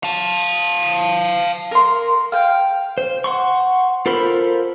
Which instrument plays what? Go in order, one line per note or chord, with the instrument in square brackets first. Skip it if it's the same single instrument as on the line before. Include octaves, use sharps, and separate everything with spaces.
[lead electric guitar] F5 A5
[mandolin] A#4 C6
F5 G5
[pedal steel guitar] C5
F#5 C6 C#6
F4 A4 A#4 C5 B5